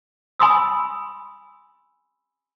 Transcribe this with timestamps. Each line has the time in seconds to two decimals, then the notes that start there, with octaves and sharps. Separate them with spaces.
0.39 G#5 B5 C6 D#6 E6